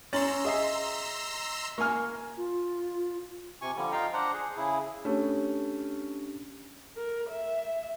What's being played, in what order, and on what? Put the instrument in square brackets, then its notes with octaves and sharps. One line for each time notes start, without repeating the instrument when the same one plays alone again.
[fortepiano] C#4 [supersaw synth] A#5 C6 E6 [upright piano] A6 F#7
[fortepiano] G#4 [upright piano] D#5 E5 C7
[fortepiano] A#3 F6 [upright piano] G#5 C#6
[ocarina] F4
[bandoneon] C3 G#5 C#6
D3 F3 G3
D#4 F4 F5 G5 A#5
D4 C5 F#5 A#5
G#4
C#3 E4 G#4
[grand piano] A3 C#4 [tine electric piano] D4 G4
[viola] A#4
E5